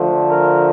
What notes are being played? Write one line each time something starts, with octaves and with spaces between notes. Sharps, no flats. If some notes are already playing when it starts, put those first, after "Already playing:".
Already playing: D3 F3 A3
A#4